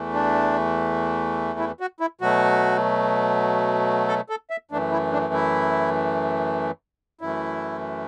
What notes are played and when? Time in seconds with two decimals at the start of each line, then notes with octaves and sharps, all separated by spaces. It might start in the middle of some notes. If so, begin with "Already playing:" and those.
Already playing: E2 E3 A3
0.14 D4
1.59 E4
1.80 F#4
2.00 E4
2.21 B2 F#3 A3 F#4
4.08 A4
4.29 A4
4.50 E5
4.71 F#2 E3 A3 D4
4.92 E4
5.12 D4
5.34 E4
7.21 F#2 E3 A3 E4